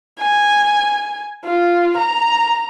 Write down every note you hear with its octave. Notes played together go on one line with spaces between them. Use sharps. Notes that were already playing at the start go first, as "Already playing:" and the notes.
G#5
F4
A#5